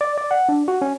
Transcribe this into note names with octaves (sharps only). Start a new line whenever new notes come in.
D5
D5
F#5
D4
F#4
C#4